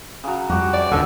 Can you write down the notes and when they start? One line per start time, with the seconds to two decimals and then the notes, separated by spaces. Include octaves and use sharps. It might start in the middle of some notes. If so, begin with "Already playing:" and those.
0.24 C#3 F#3
0.49 F2 G3 F#4 G4
0.73 D5
0.91 D#1 G#1 D#2 D3